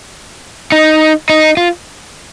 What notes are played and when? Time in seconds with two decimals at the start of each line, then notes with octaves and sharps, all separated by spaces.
0.72 D#4
1.29 D#4
1.57 F4